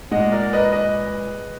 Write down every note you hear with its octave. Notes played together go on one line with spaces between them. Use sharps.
A#2 G#3 D#5 F#5
A#4 D5
B4 D#5
B4 D#5